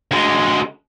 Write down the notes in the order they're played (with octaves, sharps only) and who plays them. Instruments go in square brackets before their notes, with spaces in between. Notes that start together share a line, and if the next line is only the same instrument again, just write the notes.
[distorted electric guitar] D2 G#3